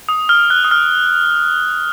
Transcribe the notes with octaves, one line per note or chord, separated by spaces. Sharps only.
D#6
F6
F#6
D#6
F6